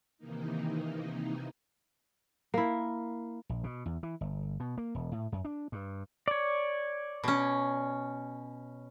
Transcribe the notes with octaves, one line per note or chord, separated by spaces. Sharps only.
C3 D#3 E3 A#3 D#4
A#3 E4
A#1
B2
E2
E3
G1
B2
A#3
E1
A2
F#2
D4
G2
C#5 D5
B2 C#4